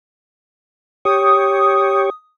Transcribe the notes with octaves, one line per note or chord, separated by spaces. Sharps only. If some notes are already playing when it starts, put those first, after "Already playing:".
G4 C#5 D#6